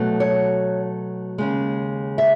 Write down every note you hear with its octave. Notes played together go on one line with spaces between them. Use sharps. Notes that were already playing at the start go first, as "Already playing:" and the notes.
Already playing: B2 F#3 A3
C#5
D#2 C#3 G#3
E5